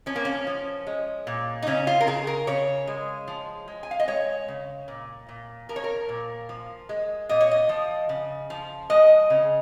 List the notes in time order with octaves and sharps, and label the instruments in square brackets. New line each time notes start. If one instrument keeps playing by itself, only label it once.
[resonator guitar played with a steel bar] F3 C#4
A#3
C#4
F3
G#3
A#2
D#4
C#3 C#4
F4
A#4
C#3 G#4
A#4
C#3 C#5
G#3
F3
G#3
G#5
F5
D#5
G#3 C#5
C#3
A#2
A#2
F3 A#4
C#5
A#4
A#2
F3
G#3
A#2 D#5
C#5
D#5
F3
C#3
F3
G#3 D#5
C#3